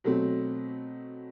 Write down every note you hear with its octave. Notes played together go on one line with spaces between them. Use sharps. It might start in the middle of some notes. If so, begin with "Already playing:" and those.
B2 F#3 A3 C4